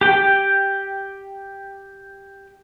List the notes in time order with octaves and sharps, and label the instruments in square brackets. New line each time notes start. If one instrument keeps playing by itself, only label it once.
[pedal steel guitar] G4 G5